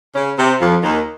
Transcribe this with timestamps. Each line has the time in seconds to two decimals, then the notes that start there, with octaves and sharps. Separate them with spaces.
0.15 C#3 C#4
0.38 C3 C4
0.61 F2 F3
0.83 D#2 D#3